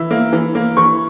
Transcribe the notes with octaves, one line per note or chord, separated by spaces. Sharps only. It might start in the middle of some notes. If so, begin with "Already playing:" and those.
Already playing: E3 E5
A#3
E3
A#3
E3 C#6